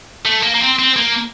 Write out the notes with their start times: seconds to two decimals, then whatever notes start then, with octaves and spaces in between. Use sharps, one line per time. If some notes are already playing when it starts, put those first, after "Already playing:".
0.25 A3
0.43 A#3
0.55 A#3
0.61 C4
0.79 C4
0.96 A#3